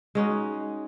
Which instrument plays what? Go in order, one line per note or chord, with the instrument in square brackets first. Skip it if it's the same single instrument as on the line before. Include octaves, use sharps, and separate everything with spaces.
[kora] G#3 C#4 D#4 F#4